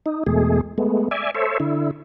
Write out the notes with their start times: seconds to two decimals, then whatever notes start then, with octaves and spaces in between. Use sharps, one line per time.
0.06 D#4
0.27 E2 B2 G#3 A3 G#4
0.78 G#3 A3 B3
1.11 D5 E5 G#5
1.35 A4 C5 C#5 E5
1.60 D3 E4